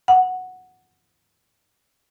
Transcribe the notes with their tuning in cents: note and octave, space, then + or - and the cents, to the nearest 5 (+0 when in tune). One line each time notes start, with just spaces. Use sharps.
F#5 -5